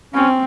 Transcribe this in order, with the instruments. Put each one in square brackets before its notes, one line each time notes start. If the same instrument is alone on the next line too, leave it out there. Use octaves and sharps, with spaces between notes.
[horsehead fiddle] C4 [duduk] C#4